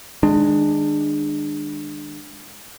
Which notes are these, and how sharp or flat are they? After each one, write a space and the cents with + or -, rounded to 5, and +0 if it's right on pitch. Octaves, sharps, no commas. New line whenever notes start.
D#3 +10 G#3 +0 D4 +25